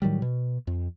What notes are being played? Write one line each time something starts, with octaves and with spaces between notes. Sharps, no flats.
A2 D#3 F#3 G3
B2
F2